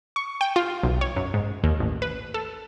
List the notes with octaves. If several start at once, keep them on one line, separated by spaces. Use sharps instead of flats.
C#6
G5
F4
B1
C#5
F#2
G#2
D#2
A1
B4
A4